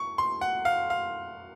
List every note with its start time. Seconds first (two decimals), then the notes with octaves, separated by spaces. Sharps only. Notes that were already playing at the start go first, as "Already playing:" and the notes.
Already playing: C#6
0.18 C6
0.41 F#5
0.65 F5
0.90 F5